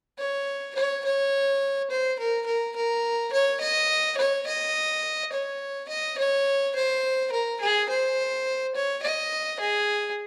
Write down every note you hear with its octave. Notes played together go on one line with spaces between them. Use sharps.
C#5
C#5
C#5
C5
A#4
A#4
A#4
C#5
D#5
C#5
D#5
C#5
D#5
C#5
C5
A#4
G#4
C5
C#5
D#5
G#4